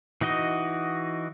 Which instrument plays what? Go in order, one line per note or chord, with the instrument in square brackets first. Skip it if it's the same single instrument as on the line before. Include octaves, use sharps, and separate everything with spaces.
[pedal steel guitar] E3 D#4 F#4 D#5